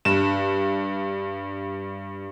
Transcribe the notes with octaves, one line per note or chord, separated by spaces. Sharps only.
G2 E7